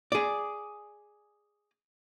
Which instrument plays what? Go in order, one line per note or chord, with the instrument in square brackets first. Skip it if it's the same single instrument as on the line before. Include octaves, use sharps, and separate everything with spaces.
[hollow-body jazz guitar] G#4 D5